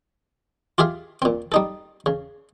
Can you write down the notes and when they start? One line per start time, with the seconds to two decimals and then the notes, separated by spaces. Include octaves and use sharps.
0.78 F4 G4 G#4 E5 F5
1.22 A#2 C4
1.52 G3 D#4 A4
2.06 C#3